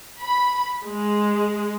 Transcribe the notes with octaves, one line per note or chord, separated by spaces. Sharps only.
B5
G#3